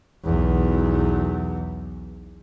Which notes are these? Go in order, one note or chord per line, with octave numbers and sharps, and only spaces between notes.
B1 E2